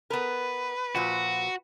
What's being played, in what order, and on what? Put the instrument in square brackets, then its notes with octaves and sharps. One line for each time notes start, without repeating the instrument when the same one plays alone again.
[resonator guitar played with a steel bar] B3 A#4 [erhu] B4
[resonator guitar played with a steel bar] A#2 F3 [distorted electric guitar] F#4